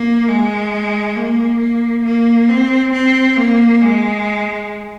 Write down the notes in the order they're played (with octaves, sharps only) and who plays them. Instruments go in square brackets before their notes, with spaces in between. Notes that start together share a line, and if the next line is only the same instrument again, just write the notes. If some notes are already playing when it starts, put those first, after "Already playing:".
Already playing: [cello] A#3
G#3
A#3
A#3
A#3
C4
C4
A#3
G#3